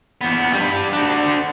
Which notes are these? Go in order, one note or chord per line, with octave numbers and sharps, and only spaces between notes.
E2 B3
G3 B4
D4 F#4